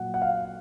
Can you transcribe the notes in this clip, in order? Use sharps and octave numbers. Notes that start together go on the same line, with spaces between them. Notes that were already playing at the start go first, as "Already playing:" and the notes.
Already playing: A#2 F#3 A#3 F#5
F#5
F5